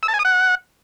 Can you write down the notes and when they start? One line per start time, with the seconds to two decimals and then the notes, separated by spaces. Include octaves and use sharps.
0.03 E6
0.08 A5
0.14 G#5
0.19 D#6
0.25 F#5